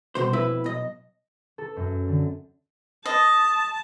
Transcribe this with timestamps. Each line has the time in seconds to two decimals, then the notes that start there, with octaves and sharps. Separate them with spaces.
0.15 C2 G#2 B2 C5
0.33 F2 B2 E4 B4 E5
0.64 B1 D#5
1.58 A4
1.76 F#2
2.08 D3
3.06 D#5 A5